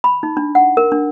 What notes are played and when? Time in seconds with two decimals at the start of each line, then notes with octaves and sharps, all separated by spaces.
0.04 B5
0.23 D#4
0.37 D4
0.55 F#5
0.77 A#4
0.92 D4